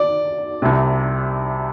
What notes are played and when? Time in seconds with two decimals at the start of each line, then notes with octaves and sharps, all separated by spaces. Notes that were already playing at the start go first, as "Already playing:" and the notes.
Already playing: D5
0.62 C2 C3